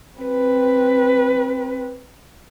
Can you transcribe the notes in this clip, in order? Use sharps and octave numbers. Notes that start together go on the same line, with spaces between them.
C4 B4